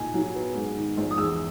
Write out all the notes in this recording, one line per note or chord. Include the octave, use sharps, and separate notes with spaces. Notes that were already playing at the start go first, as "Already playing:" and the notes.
Already playing: A#2 D#4 G#5
F#3
B3
G#2
D#3
A#1
D#6
E2 E6